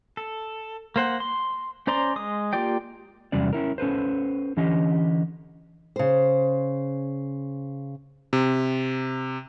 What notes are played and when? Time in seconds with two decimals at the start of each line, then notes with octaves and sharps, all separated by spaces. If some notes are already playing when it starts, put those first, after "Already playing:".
0.17 A4
0.96 A#3 C5 F#5
1.20 C6
1.87 C#4 C5 D5 A#5 C6
2.16 G#3 D#6
2.53 A#3 F4 G4 D5 G5
3.32 E2 C3 F#3 G3 C#4 D5
3.53 C#4 E4 A#4
3.78 C#4 A4 B4 C5
4.57 D3 E3 C#4 G4 D#5
5.96 C#3 C5
8.33 C3